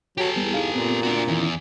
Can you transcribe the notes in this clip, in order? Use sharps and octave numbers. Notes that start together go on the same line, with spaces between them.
F#3 G4 A4
E2 G3 B3
D#4 G#4 F5
A#2 B3 C4
D4 F#4
E2 D#3 C#4 E4